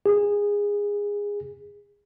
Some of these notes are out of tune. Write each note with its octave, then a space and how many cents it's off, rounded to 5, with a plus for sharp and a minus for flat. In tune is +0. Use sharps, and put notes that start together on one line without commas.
G#4 -20